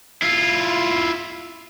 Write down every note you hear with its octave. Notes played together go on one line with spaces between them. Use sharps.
E4 F4